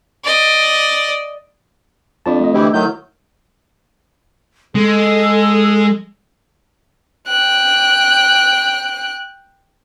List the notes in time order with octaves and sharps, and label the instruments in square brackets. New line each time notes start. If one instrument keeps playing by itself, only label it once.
[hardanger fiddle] D5 D#5
[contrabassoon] F2 [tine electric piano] D4 D5 A5
[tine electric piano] A3 D#5
[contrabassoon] D2 [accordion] E3 E4 G4
[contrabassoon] A2 [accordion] D#3 F#3 G6
[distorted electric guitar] G#3 [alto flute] A4
[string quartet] G5 F#6